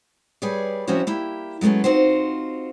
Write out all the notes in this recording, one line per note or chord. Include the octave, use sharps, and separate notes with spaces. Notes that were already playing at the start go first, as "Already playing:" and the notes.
G3 G#4 B4 C#5 D5
F3 C4 C#4 E4 F#4 C#5
A#3 E4 G4
F#3 G#3 A3 B3 C#4
C4 D#4 F4 F#4 C5